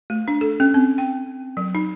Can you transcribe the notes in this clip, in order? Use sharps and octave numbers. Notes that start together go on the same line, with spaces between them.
A3
D4
A4
C#4
C4
G5
F#3
D#4